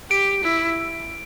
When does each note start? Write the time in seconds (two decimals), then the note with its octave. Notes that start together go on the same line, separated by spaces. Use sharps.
0.10 G4 D7
0.43 E4